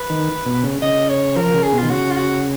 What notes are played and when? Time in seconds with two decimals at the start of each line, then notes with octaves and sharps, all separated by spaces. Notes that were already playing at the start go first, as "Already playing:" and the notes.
Already playing: B4
0.10 D#3
0.46 B2
0.63 C#3
0.82 C#3 D#5
1.09 C#5
1.36 F3 A#4
1.54 C#3
1.63 G#4
1.72 B2
1.78 D#3 F4
1.90 C#3 F#4
2.11 F4
2.17 F#4